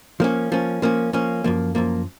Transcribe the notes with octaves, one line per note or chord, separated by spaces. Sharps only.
F3 A#3 C#4
F3 A#3 C#4
F3 A#3 C#4
F3 A#3 C#4
F#2 F3 A#3
F#2 F3 A#3